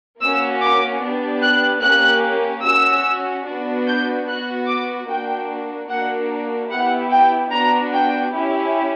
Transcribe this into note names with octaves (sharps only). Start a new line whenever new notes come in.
A#3 C#4 F#4 E6
D6
B3 D4 G4
F#6
A#3 C#4 G4 F#6
C#4 F#4 E6
B3 D4 F#4
G6
B3 F#4 F#6
D6
A#3 D4 F#4 G5
A#3 D4 F#4 F#5
B3 E4 G4 F#5
G5
B3 D4 F#4 A#5
G5
C#4 E4 G4